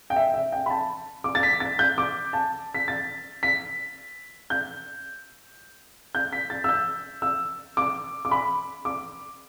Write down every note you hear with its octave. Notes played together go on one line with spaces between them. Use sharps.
G5
E5
E5
G5
B5
A5
D6
A6
B6
A6
G6
D6
A5
B6
A6
B6
G6
G6
B6
A6
E6
G6
E6
D6
D6
B5
D6